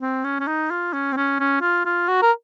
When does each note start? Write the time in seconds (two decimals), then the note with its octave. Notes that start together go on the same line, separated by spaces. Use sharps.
0.02 C4
0.24 C#4
0.40 C#4
0.47 D#4
0.71 F4
0.93 C#4
1.13 C4
1.17 C#4
1.40 C#4
1.62 F4
1.86 F4
2.08 F#4
2.22 A#4